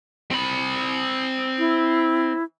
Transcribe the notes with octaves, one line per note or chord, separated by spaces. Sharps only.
C4 B5
E4